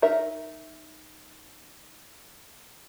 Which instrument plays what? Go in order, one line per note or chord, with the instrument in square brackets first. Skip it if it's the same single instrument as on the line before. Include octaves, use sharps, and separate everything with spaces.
[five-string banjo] D#4 A#4 E5